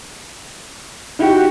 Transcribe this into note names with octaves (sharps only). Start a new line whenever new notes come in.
D#4 E4 F#4 G4